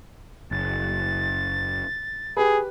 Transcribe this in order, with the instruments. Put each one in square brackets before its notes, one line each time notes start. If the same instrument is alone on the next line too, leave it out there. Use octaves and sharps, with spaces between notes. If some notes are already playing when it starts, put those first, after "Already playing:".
[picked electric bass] F#1 [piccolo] A6
[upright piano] G4 B4 [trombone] G#4